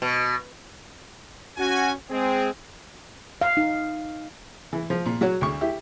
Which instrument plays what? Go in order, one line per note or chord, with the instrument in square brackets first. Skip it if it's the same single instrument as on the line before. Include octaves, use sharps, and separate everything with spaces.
[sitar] B2
[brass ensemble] C#4 F#4 G#5
G#3 C4 G#4
[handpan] F5
D#4
[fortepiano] E3
F3
A#2
F#3 F#4 C#5
D2 C#6
E4 G4